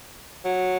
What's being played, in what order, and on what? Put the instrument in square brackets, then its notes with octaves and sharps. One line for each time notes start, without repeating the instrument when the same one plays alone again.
[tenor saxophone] F#3